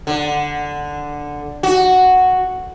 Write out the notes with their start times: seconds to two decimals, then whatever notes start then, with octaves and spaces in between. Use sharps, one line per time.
0.07 D3
1.63 F#4